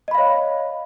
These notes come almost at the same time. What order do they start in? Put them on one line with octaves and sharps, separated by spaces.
D#5 B5 F5 C#5